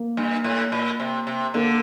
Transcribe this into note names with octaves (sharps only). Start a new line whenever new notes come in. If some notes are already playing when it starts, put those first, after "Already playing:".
Already playing: A#3
G2
A2
A#2
C3
C3
D3 A#3